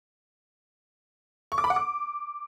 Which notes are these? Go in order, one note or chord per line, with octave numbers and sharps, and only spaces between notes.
C#6
D6
B5
F#5
D6